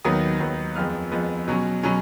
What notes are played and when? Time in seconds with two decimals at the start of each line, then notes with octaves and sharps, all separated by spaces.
0.05 D#2 D#3 F#3 B3 D#6
0.40 D#2 D#3 F#3 B3
0.76 F2 F3 G#3 B3 F6
1.12 F2 F3 G#3 B3
1.48 B2 F#3 C#4
1.83 B2 F#3 C#4